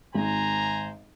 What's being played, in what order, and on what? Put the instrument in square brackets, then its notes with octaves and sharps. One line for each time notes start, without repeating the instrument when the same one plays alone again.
[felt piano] G#1 [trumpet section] C5 G#5 A#5